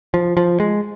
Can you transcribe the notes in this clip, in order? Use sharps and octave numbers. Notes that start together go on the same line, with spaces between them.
F3
F3
G#3